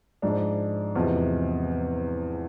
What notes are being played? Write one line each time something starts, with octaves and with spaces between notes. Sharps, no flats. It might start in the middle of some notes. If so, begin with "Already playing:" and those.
G#2 F3 G#3 D4
E2 C3 F3 G#3